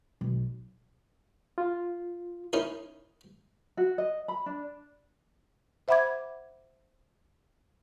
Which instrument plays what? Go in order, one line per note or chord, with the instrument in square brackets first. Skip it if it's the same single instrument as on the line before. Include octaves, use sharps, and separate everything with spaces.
[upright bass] B1
[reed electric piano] F4
[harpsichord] C#4 D#4 E4 A#4
[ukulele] F#4
D#5
B5
D4
[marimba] C5 E5 F#5 B5 D6 G#6